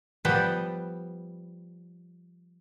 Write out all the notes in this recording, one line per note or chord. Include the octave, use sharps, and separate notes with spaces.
F3 G3 B3 B4 G5 A5